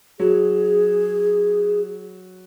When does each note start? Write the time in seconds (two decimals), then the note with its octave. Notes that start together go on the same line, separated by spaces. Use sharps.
0.20 F#3 G#4